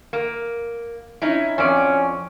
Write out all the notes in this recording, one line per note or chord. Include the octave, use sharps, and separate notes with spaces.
A#3
C#4 D#4 E4
F2 C#4 D5